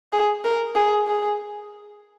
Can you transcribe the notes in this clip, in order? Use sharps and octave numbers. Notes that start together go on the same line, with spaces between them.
G#4
A#4
G#4
G#4